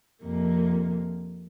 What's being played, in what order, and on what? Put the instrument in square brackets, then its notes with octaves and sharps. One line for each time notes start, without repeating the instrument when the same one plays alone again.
[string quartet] F2 C3 F3 A#3